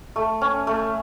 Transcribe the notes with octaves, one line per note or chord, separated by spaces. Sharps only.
A3
C#4
A3